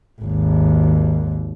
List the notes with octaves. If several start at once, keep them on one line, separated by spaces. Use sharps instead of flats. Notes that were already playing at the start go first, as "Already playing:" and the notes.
G#1 D#2